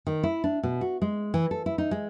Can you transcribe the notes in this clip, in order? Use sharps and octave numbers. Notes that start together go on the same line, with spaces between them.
D#3
E4
D4
B2
F#4
G#3
E3
A4
E4
D#4
G#3